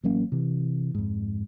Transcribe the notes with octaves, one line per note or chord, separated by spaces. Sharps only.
A1 F#3 A#3 C#4
C3 E3
F2 G#2